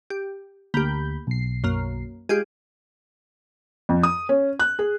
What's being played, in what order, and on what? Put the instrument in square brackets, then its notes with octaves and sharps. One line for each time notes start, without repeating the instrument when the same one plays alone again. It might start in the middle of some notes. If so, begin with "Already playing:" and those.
[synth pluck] G4
[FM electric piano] D2 B5 G6 [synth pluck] A#3 G4
[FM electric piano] B1 C7
[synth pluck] F#2 A#3
[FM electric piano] G#3 [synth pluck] F4 G4 G#4
[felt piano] F2
D#6
C#4
F#6
G#4